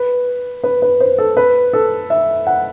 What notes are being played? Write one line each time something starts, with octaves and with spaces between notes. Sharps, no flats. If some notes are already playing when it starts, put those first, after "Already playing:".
Already playing: B4
B4
B4
C5
A4
B4
A4
E5
F#5